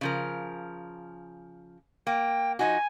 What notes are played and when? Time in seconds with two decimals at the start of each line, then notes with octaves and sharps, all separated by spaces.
0.01 C#3 F3 A#4
2.07 A#3 G5
2.59 F3 D#4 F#4 G#5